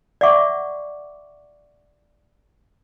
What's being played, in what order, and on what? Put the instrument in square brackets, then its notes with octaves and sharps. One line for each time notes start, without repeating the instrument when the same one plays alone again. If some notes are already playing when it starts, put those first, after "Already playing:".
[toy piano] D5 E5 F#5 C#6 D6